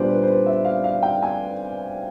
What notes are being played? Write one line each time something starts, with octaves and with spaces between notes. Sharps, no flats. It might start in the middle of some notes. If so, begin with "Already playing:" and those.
Already playing: A#2 G3 B3 D4 C5 D5
B4
C5
B4
E5
F5
F5
G5
G#5